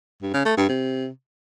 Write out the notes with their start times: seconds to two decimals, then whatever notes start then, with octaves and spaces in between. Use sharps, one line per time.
0.22 G2
0.34 C#3
0.46 A3
0.57 G2
0.69 C3